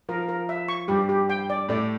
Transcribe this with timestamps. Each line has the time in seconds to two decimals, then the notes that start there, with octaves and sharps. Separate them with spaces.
0.09 F3 A#4
0.29 A#4
0.49 E5
0.68 C#6
0.88 G2 G3 G4
1.09 G4
1.30 G5
1.50 D5
1.69 A2 A3 D5